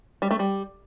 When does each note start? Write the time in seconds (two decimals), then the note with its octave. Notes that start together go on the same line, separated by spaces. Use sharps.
0.22 G3
0.31 A3
0.39 G3